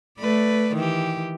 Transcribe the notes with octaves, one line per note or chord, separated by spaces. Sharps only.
A3 B4 D5
D#3 E3 G4